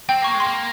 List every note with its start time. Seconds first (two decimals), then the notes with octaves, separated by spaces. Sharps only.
0.09 C4 G5
0.22 A#3 C#6
0.34 G#3
0.40 C6
0.47 A#3